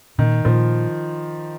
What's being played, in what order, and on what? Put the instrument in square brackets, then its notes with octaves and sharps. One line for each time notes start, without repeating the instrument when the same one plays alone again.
[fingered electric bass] A#2 [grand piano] D#3
[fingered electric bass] A#2 [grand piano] F3